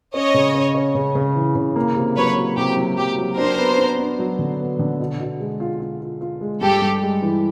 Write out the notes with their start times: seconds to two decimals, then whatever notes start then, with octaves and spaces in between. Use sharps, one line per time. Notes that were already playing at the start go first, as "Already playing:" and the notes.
0.14 C#4 C#5 D#5
0.34 C#3
0.55 C#4
0.75 C#4
0.95 C#3
1.15 C#3
1.35 E3
1.55 C#3
1.76 A#3
1.96 C3
2.16 F#3 B4 C#5
2.37 F#3
2.57 C3 G4
2.77 F#3
2.97 F#3 G4
3.18 F#3
3.37 D4 A#4 C5
3.58 B3
3.78 D4
3.98 D4
4.19 F#3
4.39 D3
4.59 B3
4.79 D3
4.99 B2
5.20 B2
5.40 G#3
5.60 F4
5.80 F4
6.01 F4
6.21 F4
6.41 G#3
6.61 G2 G4 A4
6.82 G2
7.02 G#3
7.22 E3